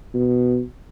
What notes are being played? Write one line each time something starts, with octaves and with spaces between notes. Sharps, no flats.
B2